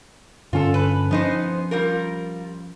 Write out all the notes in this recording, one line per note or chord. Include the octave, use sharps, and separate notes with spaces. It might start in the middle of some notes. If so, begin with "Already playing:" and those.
G2 D3 C#4 F4 A4
B4
F3 B3 C#4 D#4 C5
G3 F4 A#4